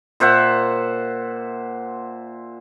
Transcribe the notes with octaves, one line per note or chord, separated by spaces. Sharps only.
A#2 C5 E5 F#5